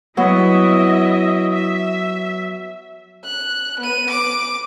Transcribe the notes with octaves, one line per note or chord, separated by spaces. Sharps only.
F#3 B3 E4 D#5 E5
E5
F#6
B3 D#7
D6